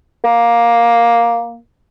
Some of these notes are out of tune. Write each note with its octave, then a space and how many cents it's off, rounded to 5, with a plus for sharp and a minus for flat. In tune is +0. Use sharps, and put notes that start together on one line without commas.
A#3 +10